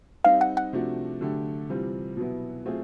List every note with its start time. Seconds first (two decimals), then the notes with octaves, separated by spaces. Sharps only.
0.25 G3 C4 D#4 F5
0.41 F#5
0.57 F#5
0.73 C3 F3 A3 D4 F#4
1.21 D3 F#3 A3 D4 G4
1.69 C3 E3 G3 C4 F4
2.17 B2 F#3 B3 E4
2.65 F#3 A3 C4 F4 G#4